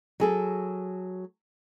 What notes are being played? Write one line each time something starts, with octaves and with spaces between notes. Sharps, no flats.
F#3 G#4 A4